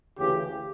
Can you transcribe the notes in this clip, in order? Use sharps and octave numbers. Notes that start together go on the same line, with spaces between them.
D2 C#3 E3 G4